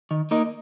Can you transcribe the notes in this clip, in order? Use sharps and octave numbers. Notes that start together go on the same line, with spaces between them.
D#3
A#3 D#4 A#4 D#5